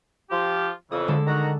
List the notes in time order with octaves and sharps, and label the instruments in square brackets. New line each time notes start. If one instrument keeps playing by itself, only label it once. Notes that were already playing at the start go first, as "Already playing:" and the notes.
[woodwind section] F3 F4 G4
[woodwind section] F2 C#3 E3 [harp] D#6
[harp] D3 G#3 A4
[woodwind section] D#3 F#4 A#5